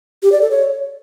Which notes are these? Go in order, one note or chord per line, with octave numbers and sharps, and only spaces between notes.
G4
D5
A4
C#5